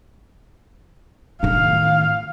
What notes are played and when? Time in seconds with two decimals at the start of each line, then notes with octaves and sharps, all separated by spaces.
1.43 A2 D#3 F5